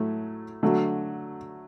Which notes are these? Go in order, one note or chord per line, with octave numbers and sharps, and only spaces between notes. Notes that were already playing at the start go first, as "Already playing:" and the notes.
Already playing: A2 F#3 A3
D3 F#3 A3